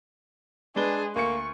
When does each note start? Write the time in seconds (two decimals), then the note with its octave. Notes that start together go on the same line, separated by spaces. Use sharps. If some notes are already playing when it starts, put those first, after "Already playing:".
0.76 G#3 D4 G#4 B4 G7
1.16 D2 A#3 C#6 C#7